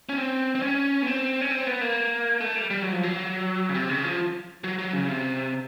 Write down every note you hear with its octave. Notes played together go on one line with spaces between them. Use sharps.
C#4
C4
C4
C#4
B3
C4
C#4
C4
B3
A#3
A3
G3
G3
F#3
F3
F#3
C#3
C3
C#3
F3
F#3
F#3
C#3
C3